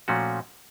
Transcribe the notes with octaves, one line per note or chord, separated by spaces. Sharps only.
A#2 F3 A3 C#4 F#4